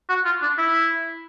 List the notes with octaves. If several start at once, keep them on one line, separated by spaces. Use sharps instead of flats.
F#4
F4
D4
E4